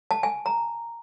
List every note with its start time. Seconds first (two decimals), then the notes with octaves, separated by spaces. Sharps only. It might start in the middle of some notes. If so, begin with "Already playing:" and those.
0.11 A5
0.23 G#5
0.46 A#5